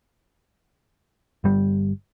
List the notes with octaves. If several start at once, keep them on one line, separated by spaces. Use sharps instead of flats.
G1 G3